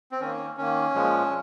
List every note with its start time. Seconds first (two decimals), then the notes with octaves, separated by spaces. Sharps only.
0.12 C4
0.20 D#3 A#3 C#4
0.57 D#3 A#3 C#4
0.94 A#2 F3 G#3